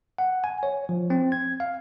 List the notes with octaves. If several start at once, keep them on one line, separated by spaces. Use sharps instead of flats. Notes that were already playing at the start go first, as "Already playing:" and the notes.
F#5
G#5
C#5
F3
C4
G#6
F5